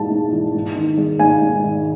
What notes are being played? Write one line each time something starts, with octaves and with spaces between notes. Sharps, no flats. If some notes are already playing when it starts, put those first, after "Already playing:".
Already playing: G#2 E3 G#3 A5
G#2
E3
G#2
D#3
G#3
G#2 G#5
G#2
D#3